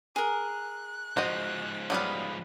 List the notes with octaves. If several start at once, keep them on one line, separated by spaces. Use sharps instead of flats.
G#4 A#4 F#6
G#2 F3 F#4 C5 D#5
F#3 G3 B3 F5 B5 D#6